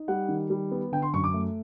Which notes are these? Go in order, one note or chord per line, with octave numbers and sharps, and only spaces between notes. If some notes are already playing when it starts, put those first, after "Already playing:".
Already playing: D#4
G3 F#5
D#3
G3
B3
D3 G5
C6
F#2 C#6
D6
A3